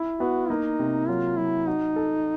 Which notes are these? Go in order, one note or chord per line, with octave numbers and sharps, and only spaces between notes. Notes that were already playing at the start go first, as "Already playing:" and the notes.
Already playing: E4
B3 F#4
A#3 D#4
C3
F#3 F4
F#3 E4
D#4 F#4
A4